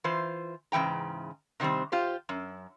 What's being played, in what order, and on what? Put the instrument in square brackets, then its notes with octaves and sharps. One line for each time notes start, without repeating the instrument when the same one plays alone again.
[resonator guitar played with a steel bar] E3 F4 C5
G#2 C#3 E3 G5 A#5
C3 D#3 F3 G3 C4
F4 G4 C5
F#2